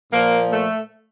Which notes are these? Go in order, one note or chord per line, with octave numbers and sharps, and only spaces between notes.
A#2 F3 A#3
A3